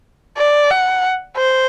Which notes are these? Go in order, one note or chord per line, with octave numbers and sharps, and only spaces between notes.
D5
F#5
C5